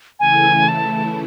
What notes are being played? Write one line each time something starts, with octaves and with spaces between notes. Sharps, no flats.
C#3 E3 A3 E4 G#5
A5